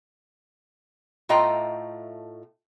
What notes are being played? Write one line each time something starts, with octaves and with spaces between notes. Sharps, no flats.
A2 A3 F4 D#5 G5 A#5